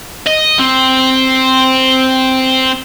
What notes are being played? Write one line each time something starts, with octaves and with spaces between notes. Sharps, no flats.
D#5
C4